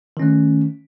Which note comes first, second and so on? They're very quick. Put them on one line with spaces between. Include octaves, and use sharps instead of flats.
D#3 C#4 A3